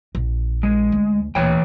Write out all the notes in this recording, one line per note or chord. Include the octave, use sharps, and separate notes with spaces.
A#1
G#3
D2
D2 A#2 E3 C#5 G5